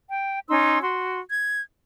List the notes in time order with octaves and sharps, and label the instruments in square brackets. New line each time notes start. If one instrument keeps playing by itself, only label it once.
[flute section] G5
C#4 D#4 C6 E6
F#4 C6
G#6